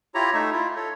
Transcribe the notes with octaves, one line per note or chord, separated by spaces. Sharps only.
E4 F4 G4 C#5 A#5
A3 D#4 E5
E4 F4
A4 C#5